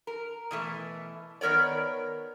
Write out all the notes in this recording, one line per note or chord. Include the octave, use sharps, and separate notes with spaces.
A#4
B2 E3 A3
D#3 B3 A#4 C#5 D5